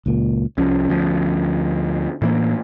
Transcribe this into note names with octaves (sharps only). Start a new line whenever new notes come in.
C#2 A#2
C2 F3 C#4
D2 F3
A2 E3 A#3